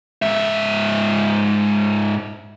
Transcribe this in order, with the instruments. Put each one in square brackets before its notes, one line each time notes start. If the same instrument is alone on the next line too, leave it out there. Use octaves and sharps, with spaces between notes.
[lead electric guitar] G#2 E5